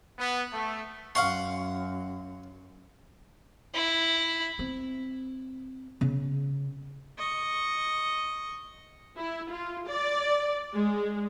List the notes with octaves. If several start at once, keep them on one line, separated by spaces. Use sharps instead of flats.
B3
A3
F#2 F5 F#5 C6 C#6
E4
C4
C#3
D#5 C#6
E4
F4
D5
G#3